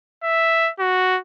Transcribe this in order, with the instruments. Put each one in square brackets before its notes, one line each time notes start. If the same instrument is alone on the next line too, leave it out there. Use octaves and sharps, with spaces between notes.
[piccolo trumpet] E5
F#4